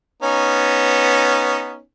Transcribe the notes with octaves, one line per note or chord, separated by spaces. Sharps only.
B3 C#4 D#4